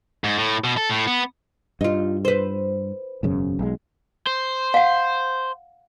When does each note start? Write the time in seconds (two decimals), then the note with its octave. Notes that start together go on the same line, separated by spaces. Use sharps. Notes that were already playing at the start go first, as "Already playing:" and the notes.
0.24 G#2
0.38 A2
0.64 B2
0.77 A4
0.90 A2
1.07 B3
1.81 G2 D#4 F4
2.25 B4 C5
3.23 E1 F#2 C#3
3.59 B1 G#3
4.27 C5
4.74 F5 F#5